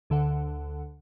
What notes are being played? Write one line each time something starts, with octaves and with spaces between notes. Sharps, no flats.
D2 D3 A4 F#5